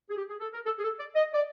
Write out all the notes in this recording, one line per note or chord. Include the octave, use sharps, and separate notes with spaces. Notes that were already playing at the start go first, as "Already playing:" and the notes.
G#4
G4
G#4
A4
A#4
A4
G#4
A4
D5
D#5
D5